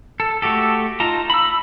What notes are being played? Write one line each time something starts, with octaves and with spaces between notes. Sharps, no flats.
A4
A3 F#4 G4 A4
D#4 F4 A5 A#5
B5 E6